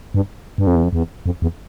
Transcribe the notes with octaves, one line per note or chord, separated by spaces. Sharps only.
G2
G2
F2
E2
F2
E2
F2
E2